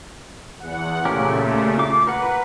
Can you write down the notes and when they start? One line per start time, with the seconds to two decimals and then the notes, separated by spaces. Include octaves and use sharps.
0.60 E2 F#5
1.05 A#2 C#3 A3 C#4 G4 A#4
1.78 F4 D6
2.07 A#4 B4 F#5